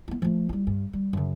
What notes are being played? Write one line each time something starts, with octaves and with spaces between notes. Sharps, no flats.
B3 E4
F3 A3
G3 E4
G2
G3
F#2 C#3